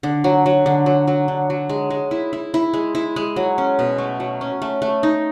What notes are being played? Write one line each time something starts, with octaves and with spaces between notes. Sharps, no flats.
D3
F#3
F#3
D3
F#3
F#3
D3
F#3
G#3
G#3
E4
E4
E4
G#3
E4
G#3
F#3
C#4
B2
A3
F#3
C#4
A3
A3
D#4